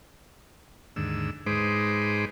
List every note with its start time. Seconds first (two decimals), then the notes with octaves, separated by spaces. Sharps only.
0.96 D#2 G#2 D3 E6
1.46 G#2 G#3 D#4 B4 C5 D6